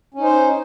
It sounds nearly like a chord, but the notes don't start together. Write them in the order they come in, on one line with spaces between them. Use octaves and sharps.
C#4 D#4 C5